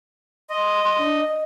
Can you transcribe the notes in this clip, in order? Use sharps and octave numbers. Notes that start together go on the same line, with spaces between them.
D#5 C6
D4
D#5